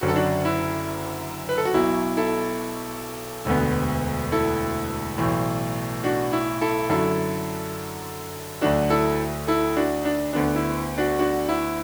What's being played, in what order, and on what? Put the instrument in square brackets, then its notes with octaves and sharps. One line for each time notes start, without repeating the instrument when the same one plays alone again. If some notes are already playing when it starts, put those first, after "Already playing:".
[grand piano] F#1 F#2 D3 F#4
A4
D4 F#4
E4
B4
A4
F#4
B1 B2 F#3 E4
E4 A4
E1 D2 D3 B3
E4 A4
B1 A2 E3 A3
D4 F#4
E4
E4 A4
F#2 D3 F#3 E4 A4
D2 D3 F#3 A3 D4 F#4
E4 A4
E4 A4
D4 F#4
D4
D2 D3 B3 D4
E4
D4 F#4
D4 F#4
E4